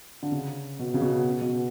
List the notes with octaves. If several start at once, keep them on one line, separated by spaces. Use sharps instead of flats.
D3
C#3
B2
C#3
B2
B2